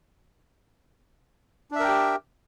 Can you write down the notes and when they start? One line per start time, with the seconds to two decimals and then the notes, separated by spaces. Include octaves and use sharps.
1.71 D4
1.76 E5
1.80 A#4
1.84 G5
1.88 G4